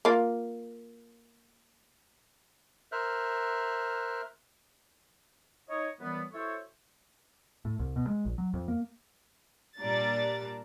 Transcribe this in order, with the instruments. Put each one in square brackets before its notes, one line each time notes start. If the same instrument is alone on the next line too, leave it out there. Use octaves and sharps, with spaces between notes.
[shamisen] A#3 F4
[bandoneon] A#4 C5 E5 F6 F#6
[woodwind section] D#4 C#5 D#5
F#2 E3 G3 B3
E4 F#4 A4 C5 C#5
[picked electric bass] A2
C2
B2
G#3
A#1
F#3
F2
A#3
[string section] A#2 G3 D4 D5 A#5 A6